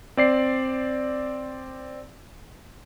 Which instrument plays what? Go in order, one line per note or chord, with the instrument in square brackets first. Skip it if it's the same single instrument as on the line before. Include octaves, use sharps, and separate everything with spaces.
[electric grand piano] C4 D5 C7